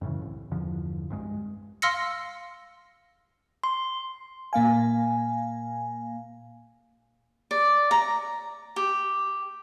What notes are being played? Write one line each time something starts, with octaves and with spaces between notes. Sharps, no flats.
F#2 A2 C#3 E3
C2
E2 G2 D3 F3
C2 G2 G#3
F5 C6 E6 F6 A#6 C#7
C6
A#2 A#3 F5 G#5
D5
A#5
G4